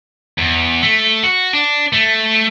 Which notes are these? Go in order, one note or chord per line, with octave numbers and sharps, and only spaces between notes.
E2
A3
F#4
D4
A3